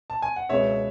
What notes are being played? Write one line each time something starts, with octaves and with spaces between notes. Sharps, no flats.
A5
G#5
F#5
C#2 B2 G#3 B3 C#5 E5